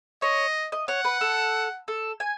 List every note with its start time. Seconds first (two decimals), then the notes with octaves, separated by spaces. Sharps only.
0.22 C#5 D#5
0.72 D#5
0.88 C#5 F#5
1.05 B4
1.21 A4
1.88 A4
2.20 G#5